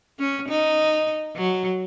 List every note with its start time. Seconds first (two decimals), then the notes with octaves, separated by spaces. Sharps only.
0.19 C#4
0.48 D#4
1.36 F#3